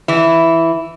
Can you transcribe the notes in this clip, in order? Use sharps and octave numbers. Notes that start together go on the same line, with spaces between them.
E3 E4